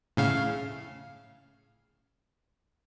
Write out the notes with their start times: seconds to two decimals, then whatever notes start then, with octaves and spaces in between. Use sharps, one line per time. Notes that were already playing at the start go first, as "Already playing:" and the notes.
0.17 A2 C#3 F5